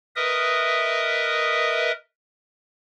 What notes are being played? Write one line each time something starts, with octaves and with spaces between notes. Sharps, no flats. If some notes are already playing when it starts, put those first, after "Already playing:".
A#4 B4 D#5 E5 D#6